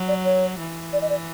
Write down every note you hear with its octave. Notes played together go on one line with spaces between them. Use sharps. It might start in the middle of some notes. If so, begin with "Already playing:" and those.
Already playing: F#3
D5
C#5
E3
D5
D#5
D5